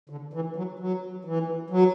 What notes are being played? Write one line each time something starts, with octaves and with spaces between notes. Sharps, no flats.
D3
E3
F#3
F#3
E3
F#3